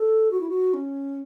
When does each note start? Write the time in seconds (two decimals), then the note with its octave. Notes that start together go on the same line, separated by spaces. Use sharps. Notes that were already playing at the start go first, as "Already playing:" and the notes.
Already playing: A4
0.31 F#4
0.40 E4
0.49 F#4
0.74 C#4